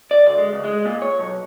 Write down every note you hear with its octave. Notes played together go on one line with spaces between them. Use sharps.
D5
D2
G#3
C#2
G#3
A#2
C#5
B1